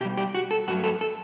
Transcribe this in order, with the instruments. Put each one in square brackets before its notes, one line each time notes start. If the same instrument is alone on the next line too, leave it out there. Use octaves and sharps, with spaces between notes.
[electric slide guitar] B2 G4
G3
G4
F#4
A4
G2 F#3 A3 F#4
A4
A4